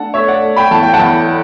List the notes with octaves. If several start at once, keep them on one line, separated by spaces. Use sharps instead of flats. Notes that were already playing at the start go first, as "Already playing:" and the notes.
Already playing: A3 D4 F#5 A5
A3 C#5 E5
D5 F#5
A3
G5 B5
E2 A5
G5
F#5 A5
E2